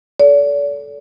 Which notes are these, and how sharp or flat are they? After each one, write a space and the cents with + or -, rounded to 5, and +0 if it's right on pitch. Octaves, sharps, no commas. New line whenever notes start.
A4 -10 D5 -40